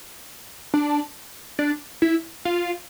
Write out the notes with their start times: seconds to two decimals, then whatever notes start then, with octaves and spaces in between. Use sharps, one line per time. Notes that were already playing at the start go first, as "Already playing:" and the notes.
0.74 D4
1.59 D4
2.02 E4
2.45 F4